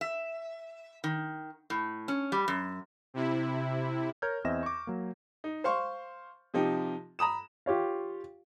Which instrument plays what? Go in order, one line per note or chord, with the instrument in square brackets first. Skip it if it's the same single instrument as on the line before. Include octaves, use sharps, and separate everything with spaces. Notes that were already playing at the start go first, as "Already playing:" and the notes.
[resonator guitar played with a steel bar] E5
D#3
A2
C#4
G3
F#2
[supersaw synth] C3 E4
[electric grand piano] A#4 C#5 A#5 F6 G6 G#6
E2 C4 D#5 E5 A#6 E7
C#6 D6
F#3 A#3
[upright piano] D#4
C5 F5 C6 C#6
C3 F3 D#4 G4
A#5 B5 D#6 E7
[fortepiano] F4 G4 C#5 F5